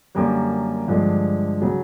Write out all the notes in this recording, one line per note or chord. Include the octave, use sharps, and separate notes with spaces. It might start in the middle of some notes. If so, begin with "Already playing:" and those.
F#2 D3 G3 A#3
G2 D3 F3 G#3
C#3 F#3